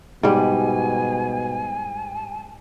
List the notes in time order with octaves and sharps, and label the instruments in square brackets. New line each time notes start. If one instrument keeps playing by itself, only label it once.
[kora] G#2 G3 [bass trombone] B2 [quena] G#5